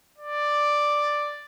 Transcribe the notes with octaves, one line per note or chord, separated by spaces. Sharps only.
D5